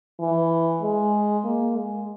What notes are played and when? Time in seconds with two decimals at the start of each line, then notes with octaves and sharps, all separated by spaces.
0.20 E3
0.82 G#3
1.45 A#3
1.76 G#3